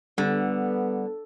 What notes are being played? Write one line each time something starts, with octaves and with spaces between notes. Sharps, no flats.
D3 G3 B3